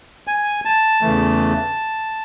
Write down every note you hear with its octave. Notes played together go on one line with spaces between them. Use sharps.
G#5
A5
E2 C#3 E3 A3